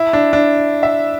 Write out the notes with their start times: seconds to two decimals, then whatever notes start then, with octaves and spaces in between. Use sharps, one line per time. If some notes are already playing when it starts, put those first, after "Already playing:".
Already playing: E4
0.13 D4
0.33 D4
0.83 E5